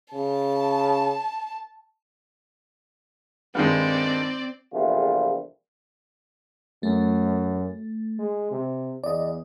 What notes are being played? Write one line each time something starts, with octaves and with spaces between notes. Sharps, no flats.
C#3 A5
G2 D#3 G#3 C4 D5
A#1 E2 C3 G3 A3 F4
F#2 A3
G#3
C3
E2 D5 D#5